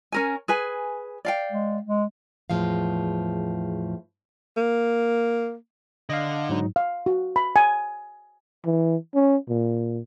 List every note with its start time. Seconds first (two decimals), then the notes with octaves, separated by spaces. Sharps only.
0.12 C#4 A#4 G#5
0.48 G#4 B4 G#5
1.25 D5 F5 G5
1.52 G#3
1.85 G#3
2.50 E2 A2 F3 G#3 F5
4.57 A#3
6.09 D3 D#5 F5
6.49 G#2 F#3 D#4
6.76 F5
7.06 F#4
7.36 B5
7.56 G#5
8.66 E3
9.15 C#4
9.49 A#2